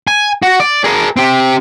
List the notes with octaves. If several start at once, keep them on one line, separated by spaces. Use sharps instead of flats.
G#5
F#4
D5
G#4 A#4
C4 G4